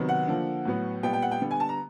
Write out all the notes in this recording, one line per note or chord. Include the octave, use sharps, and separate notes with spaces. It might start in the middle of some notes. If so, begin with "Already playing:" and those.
Already playing: C3 D#3 F#3 B3
F#5
D3 F3 A#3
A2 F#3 B3
A#2 G3 B3 G5
G5
F#5
G5
D3 G3 B3
G#5
A5
A#5